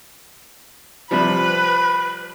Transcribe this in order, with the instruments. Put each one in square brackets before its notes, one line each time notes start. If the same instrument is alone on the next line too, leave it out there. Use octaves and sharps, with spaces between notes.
[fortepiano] C3 F3 G3 [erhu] B4 [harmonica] B5